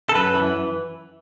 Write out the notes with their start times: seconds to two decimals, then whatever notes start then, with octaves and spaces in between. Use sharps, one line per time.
0.09 A4
0.15 F#2 B4
0.35 E3